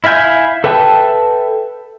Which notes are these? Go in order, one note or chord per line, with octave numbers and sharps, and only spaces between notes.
E4 E5 F5 G#5 G6
A4 B4 E5 G5 A5